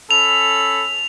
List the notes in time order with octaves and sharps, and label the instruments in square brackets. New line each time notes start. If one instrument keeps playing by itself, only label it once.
[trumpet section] C#4 A4 B5 [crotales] F7